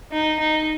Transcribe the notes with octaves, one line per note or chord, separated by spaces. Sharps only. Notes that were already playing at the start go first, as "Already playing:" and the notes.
D#4
D#4